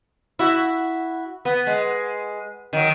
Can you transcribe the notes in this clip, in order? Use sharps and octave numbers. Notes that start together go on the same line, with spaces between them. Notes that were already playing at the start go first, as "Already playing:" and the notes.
E4 F#4
B3
G#3
D#3 F#3